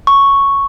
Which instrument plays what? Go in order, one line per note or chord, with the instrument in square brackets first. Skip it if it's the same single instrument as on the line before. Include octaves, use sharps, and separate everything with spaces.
[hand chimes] C#6